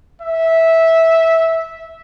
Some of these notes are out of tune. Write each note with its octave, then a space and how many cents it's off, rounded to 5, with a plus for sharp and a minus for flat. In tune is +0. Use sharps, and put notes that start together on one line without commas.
E5 -10